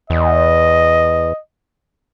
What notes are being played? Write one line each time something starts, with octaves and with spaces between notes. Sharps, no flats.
E2 D#5